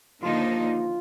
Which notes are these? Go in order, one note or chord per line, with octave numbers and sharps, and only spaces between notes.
D#2 D3 F3 A#3 D#4 F4